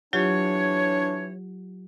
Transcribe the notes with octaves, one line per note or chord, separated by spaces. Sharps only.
E3 F#3 D4 F4 G4 C#5